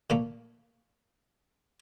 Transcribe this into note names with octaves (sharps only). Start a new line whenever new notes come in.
A#2 A3 A#3